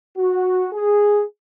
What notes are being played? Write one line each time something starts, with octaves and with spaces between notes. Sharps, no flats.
F#4
G#4